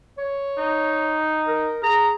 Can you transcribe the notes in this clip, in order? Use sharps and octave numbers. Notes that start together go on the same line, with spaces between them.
C#5
D#4
A#4
G#4 A#5